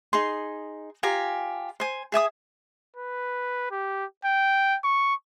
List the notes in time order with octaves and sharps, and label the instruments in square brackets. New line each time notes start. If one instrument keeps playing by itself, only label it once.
[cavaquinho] D#4 G#4 C6
F4 G4 G#5 A#5
C5 G#5
G#4 E5 G#5 D#6
[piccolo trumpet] B4
G4
G5
C#6